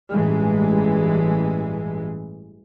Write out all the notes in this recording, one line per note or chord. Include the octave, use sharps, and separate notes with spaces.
A1 G2 E3 G#3